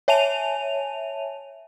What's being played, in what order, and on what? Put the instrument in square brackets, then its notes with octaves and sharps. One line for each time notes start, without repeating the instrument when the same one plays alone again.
[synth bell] C#5 E5 G#5 A5 D#7 F7